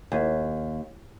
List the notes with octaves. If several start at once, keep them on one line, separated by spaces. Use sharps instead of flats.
D#2